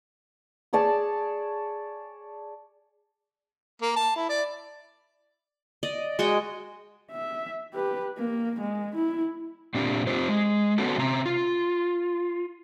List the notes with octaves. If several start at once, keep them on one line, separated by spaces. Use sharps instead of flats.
G#4 C#5 D5 A5
A#3
A5
E4
D5
D5 D#5
G#3 F#4 D#5 G5
E5
G4 B4
A#3
G#3
E4
A#2 C4 D4 G4
C4 F4 G4 C5
G#3
B3 C#4 F#4 A4
C3 C4 A#5
F4